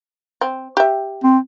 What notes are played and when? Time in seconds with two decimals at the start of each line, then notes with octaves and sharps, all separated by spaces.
0.41 C4
0.77 G4 E5
1.23 C4